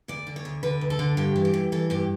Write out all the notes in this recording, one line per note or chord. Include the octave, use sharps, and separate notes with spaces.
D2 D5
D3
C#5
D2
D3 B4
D2
A4
D3
G2 G4
E3
G4
G2
E3 A4
G2 G4